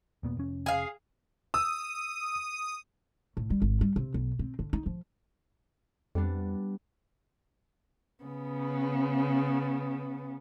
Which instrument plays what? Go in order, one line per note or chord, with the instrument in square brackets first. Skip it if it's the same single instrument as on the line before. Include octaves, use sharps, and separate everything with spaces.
[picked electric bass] D#1 A#2 B3
F1 C#4
[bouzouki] G#4 F5
[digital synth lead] D#6 [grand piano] E6
[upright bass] A2
G3
G#1
G3
C3
B1
C4
D3
D#4
F3
[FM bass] F2 [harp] G3 B3 D4
[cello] C#3 B3